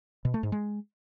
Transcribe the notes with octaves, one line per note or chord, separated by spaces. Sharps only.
B2
A3
G#2
G#3